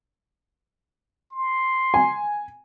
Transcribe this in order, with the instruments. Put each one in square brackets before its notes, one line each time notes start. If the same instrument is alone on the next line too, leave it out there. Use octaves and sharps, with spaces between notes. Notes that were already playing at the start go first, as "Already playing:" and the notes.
[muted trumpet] C6
[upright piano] G#5